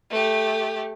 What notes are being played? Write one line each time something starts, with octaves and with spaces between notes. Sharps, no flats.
A3 G4